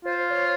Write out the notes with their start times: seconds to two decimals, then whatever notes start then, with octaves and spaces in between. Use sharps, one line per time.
0.05 F4 C5
0.31 C#5